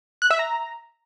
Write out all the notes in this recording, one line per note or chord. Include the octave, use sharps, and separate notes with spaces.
F#6
E5
A#5